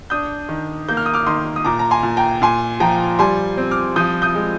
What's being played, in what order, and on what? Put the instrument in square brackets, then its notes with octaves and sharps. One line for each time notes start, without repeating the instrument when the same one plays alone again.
[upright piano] D4 D#6 G6
D#3
A#3 G6
F6
D#6
D6 F6
D#3 C6 D#6
D#6
A#2 A#5 D6
A#5
G#5 C6
A#2
G5 A#5
A#2 G#5 C6
F3 G5 A#5
G3 G#5 C6
C4
D6 F6
F3 D#6 G6
D#6 G6
G#3